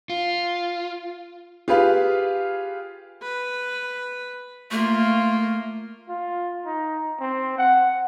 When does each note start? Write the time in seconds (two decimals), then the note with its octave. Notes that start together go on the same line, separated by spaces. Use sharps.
0.10 F4
1.68 F4 G4 G#4 B4 F5
3.23 B4
4.71 A3 A#3 F4
6.09 F4
6.65 D#4
7.20 C4
7.58 F#5